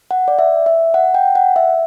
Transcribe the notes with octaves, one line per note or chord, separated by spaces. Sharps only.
F#5
D5
E5
E5
F#5
G5
F#5
E5